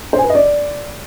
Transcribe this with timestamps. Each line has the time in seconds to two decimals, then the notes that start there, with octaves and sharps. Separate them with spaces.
0.13 C5
0.19 G#5
0.24 B4
0.29 D#5
0.35 D5